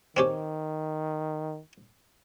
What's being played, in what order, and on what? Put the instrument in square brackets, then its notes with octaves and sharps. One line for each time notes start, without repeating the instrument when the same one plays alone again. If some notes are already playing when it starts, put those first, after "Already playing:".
[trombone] D#3 [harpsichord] C4 C#4 G4